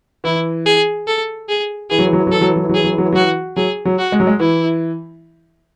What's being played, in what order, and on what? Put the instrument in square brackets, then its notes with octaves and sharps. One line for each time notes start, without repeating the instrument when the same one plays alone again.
[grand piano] E3 [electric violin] E4
[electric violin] G#4
A4
G#4
[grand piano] E3 [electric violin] G#4
[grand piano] F#3
E3
F#3
E3
F#3
[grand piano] E3 [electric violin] A4
[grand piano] F#3
E3
F#3
E3
F#3
[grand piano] E3 [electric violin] G#4
[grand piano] F#3
E3
F#3
E3
F#3
[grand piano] E3 [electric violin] F#4
[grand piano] F#3 [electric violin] G#4
[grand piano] F#3
[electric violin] F#4
[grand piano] G#3
F#3
G#3
[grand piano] E3 [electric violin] E4